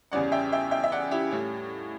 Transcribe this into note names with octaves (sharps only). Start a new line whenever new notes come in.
E2 C#3 G3 C#4 D5 F#5
E5 G5
E5 G5
E5 G5
E5
D5 F#5
E4 G4
A2 G3 C#4